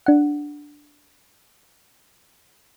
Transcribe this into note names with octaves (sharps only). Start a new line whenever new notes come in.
D4 F#5